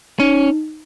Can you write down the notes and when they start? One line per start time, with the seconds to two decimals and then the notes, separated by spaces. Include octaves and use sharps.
0.19 C#4 D#4